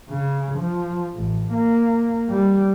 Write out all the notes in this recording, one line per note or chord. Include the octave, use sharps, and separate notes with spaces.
C#3
F3
A1
A#3
G3